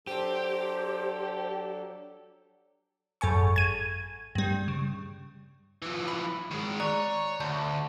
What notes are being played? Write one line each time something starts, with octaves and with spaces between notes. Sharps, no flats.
F#3 D4 G4 A4 C5
G#1 F#2 A4 G#5 C#6
G#6 D#7
G2 G3
C#3
E3 F3
B5
D#3 G#3
C#5 D5 A#5 F#6
D2 A5 G6